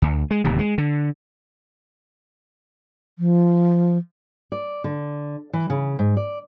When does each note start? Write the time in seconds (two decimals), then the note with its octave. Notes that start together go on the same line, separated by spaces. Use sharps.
0.02 D2
0.31 G#3
0.44 D1 D#2 C3
0.59 G#3
0.78 D3
3.19 F3
4.52 D5
4.84 D3
5.53 E3
5.70 C#3
5.99 G#2
6.17 D5